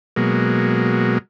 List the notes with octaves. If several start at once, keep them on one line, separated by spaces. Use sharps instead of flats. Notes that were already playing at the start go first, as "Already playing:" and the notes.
B2 F#3 G#3 A#3